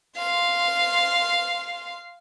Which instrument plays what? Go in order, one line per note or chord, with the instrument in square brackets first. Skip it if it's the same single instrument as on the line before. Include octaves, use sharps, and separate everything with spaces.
[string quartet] F5 C6